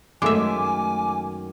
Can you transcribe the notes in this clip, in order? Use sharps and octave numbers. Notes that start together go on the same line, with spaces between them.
F#2 D#3 G#3 A3 E5 G#5 D6